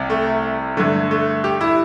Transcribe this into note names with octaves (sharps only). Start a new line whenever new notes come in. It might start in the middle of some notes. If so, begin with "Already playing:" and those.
Already playing: C2 C3
A3
G2 D3 A3
A3
G4
E4